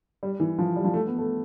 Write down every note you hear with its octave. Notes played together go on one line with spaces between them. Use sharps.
G3
E3
F3
G3
F3
A3
B3
A3